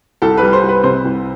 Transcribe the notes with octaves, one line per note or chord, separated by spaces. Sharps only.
C2 A4
B4
G3
C5
C2
B4
C3 C5
C2